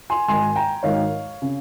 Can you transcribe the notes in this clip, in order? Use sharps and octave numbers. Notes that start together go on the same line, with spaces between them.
G#5 C6
G#1 G#2 D#3 G#5 C6
G5 A#5
G#1 G#2 D#3 C#5 F5
C#3